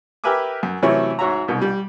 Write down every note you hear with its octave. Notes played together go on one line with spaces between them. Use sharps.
G4 A#4 B4 E5 G#5 D6
F#2
C3 E3 F#3 A3 C#4 E4
G#2 F#4 C#5 E5 A#5
C2 G#2 B2
G3